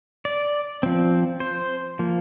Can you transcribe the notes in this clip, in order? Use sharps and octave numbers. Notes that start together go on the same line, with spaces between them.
D5
F3 C4
C5
F3 A#3